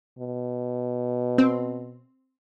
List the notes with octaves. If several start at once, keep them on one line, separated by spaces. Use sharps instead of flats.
B2
C4